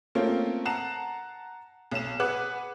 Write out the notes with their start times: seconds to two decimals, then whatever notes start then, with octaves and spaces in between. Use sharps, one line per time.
0.15 A3 A#3 C4 C#4 F4
0.65 F#5 A5 A#5 F#6 C7 E7
1.91 B1 E7
2.20 G#4 B4 F#5 D6 F#6